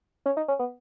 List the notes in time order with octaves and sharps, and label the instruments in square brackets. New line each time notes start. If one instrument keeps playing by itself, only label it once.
[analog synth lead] C#4
D#4
C#4
B3